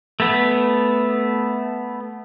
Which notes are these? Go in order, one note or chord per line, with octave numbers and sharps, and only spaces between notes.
A3 B3